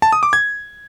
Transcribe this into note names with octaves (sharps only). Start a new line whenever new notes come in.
A5
D#6
D6
G#6